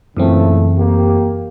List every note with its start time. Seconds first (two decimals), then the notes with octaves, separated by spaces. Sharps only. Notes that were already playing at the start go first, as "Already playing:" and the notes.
0.17 F#2 A#2 C#3 E3 A3 C4
0.77 A#3 G4